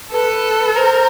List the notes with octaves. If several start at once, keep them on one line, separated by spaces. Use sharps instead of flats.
A4 B4
A#4 C5